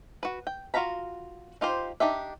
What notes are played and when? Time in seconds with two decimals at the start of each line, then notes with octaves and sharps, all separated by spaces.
0.23 F#4 B4
0.47 G5
0.74 F4 F#4 F5 A#5 B5
1.61 D#4 F4 G4 C5
2.00 D4 D#4 G4 E5